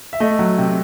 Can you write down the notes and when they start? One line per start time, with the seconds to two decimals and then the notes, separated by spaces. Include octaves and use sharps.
0.13 E5
0.20 A3 D#5
0.39 F#3
0.58 C3